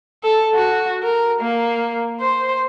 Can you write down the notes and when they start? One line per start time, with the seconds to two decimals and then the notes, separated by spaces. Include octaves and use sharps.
0.23 A4
0.55 F#4
1.03 A#4
1.41 A#3
2.21 C5